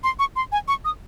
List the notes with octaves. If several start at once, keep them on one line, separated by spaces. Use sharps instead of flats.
C6
C#6
C6
G#5
C#6
D#6